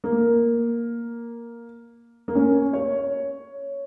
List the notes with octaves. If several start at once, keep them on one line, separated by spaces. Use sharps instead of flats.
A#3
A#3
C#4
C#5